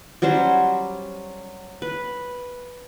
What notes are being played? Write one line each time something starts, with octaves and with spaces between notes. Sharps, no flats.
F#3 G3 C#4 C5
B4